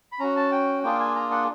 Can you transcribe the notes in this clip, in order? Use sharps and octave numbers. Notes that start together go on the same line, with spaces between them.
B5
C#4 F#4 A#5
A5
G5
A#3 D4 F4 G#4 G5
G#5
A#5
F#5